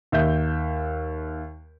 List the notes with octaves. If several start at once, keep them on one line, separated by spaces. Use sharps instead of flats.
D#2 E5 G6